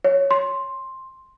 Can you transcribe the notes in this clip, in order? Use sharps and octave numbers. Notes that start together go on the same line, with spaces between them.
C#5
C6